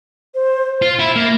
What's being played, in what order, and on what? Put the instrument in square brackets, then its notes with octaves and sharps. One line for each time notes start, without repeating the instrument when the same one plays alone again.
[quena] C5
[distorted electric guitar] F4
E4
A#3